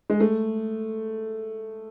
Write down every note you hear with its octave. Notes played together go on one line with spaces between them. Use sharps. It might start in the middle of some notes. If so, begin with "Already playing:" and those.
G#3
A3